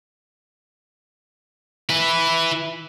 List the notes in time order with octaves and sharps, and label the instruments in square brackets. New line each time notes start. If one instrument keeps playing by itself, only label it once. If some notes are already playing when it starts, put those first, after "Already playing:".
[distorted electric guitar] E4 B4